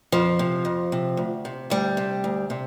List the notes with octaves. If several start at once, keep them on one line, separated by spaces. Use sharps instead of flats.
F2 F3
C3
F2
C3
D2
C3
D2 G3
C3
D2
C3